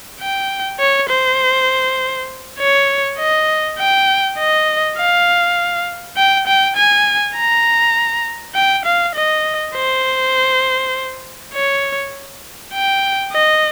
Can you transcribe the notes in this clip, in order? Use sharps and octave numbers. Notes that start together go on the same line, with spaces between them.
G5
C#5
C5
C#5
D#5
G5
D#5
F5
G5
G5
G#5
A#5
G5
F5
D#5
C5
C#5
G5
D#5